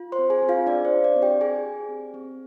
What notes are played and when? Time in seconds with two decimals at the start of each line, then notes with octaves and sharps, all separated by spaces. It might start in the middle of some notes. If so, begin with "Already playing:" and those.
Already playing: F4
0.12 C5 C6
0.18 C4
0.30 G#4 G#5
0.42 C4
0.49 F4 F5
0.67 D4 G#4 D5
0.85 C5
0.91 F4
1.04 D4 D5
1.16 C4
1.22 G4 G5
1.41 G4 G#4 G#5
1.65 G4
1.89 C4
2.14 C4